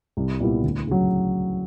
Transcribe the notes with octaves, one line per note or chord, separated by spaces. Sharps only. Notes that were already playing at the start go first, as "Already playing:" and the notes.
C2
A#2 G3 B3 E4
D2
C#3 F#3